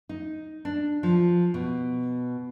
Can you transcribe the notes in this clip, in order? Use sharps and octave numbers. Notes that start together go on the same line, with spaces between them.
D#4
D4
F3
B2